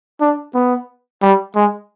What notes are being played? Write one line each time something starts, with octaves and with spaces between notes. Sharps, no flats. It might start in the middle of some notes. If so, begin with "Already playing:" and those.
D4
B3
G3
G#3